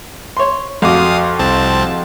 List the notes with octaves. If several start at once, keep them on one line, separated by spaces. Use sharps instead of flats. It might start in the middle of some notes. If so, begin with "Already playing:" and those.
C#5 C6
F2 F#4 F5 D6 D#6
C2 C4 A5